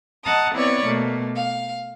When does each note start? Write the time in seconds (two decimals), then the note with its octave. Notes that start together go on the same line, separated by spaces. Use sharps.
0.24 D#5 F#5 A5 A#5 D#6
0.54 B3 C4 E4 B4 C#5 D5
0.84 B2 A3 A#3
1.36 F5